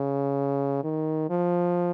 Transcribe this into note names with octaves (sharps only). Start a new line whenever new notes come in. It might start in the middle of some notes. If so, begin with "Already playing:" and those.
Already playing: C#3
D#3
F3